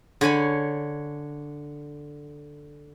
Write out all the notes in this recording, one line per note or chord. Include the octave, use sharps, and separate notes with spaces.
D3 C#5 G#5 B5